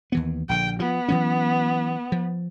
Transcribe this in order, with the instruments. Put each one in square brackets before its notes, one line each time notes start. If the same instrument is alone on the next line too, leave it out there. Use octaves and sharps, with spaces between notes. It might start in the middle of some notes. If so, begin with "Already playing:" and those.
[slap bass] D#2 E3 B3
[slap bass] A#1 D3 [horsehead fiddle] G5
[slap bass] F3 [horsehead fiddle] B3
[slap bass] E3 F#3 C#4
F3